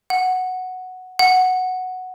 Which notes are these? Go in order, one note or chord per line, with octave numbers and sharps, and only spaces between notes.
F#5
F#5